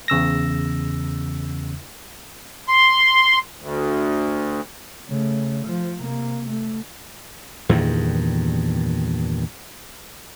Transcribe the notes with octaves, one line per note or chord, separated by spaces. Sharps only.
E2 C#3 E6 A#6
C6
D2
C#3 A3
F3
C3 A#3
A3
E2 G2 A#2 D#3